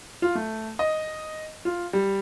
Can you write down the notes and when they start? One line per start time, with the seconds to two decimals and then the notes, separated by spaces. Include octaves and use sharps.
0.22 F4
0.35 A3
0.79 D#5
1.65 F4
1.93 G3